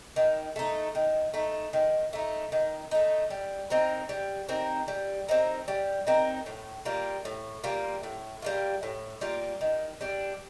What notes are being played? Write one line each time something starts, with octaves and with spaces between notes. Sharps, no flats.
D#3
A3 D#4
D#3
A3 D#4
D#3
A3 D#4
D#3
A3 D#4
G3
C4 D#4 A#4
G3
C4 D#4 A#4
G3
C4 D#4 A#4
G3
C4 D#4 A#4
A2
G3 A#3 F4
A2
G3 A#3 F4
A2
G3 A#3 F4
A2
G3 A#3 F4
D#3
G3 D4